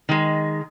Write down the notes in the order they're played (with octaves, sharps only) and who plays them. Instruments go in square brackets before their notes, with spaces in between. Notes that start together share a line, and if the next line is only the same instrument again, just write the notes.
[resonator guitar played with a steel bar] D#3 G#3